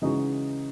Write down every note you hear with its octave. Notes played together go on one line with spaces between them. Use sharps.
C#3 E3 G#3 D#4 F#4